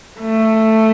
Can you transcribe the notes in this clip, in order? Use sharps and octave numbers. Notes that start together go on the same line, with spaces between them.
A3